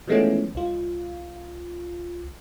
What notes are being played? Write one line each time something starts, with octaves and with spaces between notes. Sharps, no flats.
E3 F3 G#3 A3 B3 C#4
C2 F4